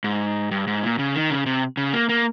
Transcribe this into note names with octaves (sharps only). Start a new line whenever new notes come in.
G#2
G2
G#2
A#2
C#3
D#3
C#3
C3
C#3
A#3
A#3